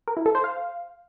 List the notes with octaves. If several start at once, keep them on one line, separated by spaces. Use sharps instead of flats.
A#4
E4
A4
C5
F5